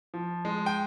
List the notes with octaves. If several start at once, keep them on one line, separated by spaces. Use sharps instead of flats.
F3
G#3
G5